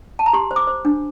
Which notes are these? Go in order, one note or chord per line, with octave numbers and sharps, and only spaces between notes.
A5
A#5
G4 C6
C5
D6
C5
D4